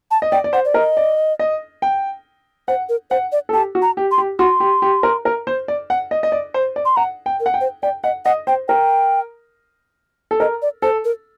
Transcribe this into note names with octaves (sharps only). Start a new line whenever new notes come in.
A5
D#5
D5 G5
D5
C5 F#5
D5
A#4 D#5
D5
D#5
G5
C5 F#5
A#4
C5 F#5
D5
A4
G4 A5
F#4
A#5
G4
C6
G4
F#4 C6
G4
G4
A#4
A#4
C5
D5
F#5
D#5
D#5
D5
C5
D5
C6
F#5 A#5
G5
A#4
F#5
G5
C5
D5 G5
D#5 F#5
D#5 F#5
C5 G5
A#4 G5
A4
A#4 D#5
D5
A4 C5
A#4